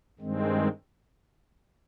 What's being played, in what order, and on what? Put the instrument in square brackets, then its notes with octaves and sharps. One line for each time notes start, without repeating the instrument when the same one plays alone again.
[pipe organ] G2 D#3 G#3 C4